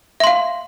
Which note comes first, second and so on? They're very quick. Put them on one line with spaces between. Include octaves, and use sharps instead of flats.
E5 C6 F5